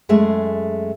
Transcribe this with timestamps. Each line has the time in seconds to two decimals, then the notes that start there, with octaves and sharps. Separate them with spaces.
0.09 F#2 G#3 A3 G#4 E5